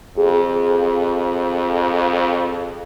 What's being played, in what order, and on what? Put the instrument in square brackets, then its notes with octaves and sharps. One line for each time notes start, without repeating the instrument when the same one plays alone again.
[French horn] F2 [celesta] G#4